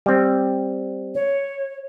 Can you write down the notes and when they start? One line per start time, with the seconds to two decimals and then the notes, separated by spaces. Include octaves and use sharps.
0.06 G3 C4
1.15 C#5